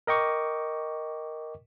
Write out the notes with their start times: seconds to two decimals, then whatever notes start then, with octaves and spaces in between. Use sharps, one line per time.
0.07 A#4 D#5 G5 C#6 D6